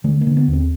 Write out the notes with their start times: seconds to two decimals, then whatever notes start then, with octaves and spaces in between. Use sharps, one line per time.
0.04 D3 A3
0.21 A#3
0.27 D3
0.37 B3
0.48 D#2
0.53 C4